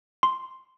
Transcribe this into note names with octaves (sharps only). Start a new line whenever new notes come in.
C6